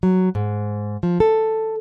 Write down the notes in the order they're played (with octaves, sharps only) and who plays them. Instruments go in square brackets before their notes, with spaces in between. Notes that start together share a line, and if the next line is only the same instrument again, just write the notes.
[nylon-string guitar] F#3
G#2
F3
A4